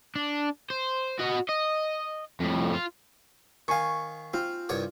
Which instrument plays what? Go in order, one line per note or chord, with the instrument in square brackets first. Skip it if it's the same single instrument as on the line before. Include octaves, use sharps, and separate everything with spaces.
[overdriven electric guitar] D4
C5
F#4 D#5
D#5
F2 A2
F4
[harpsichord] D#3 F5 [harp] G#5 C#6
[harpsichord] C4 [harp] F4
[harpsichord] C2 G2 C#5